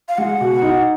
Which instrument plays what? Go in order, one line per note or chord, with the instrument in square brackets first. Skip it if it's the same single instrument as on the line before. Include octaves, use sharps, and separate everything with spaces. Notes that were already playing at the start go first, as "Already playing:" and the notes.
[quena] F5
[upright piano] G#3 [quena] F#5
[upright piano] B2
D#4